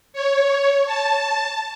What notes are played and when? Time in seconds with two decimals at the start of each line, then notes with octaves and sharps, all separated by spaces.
0.13 C#5
0.86 A5